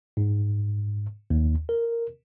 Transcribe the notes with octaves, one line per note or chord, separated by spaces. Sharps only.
G#2
D#2
A#4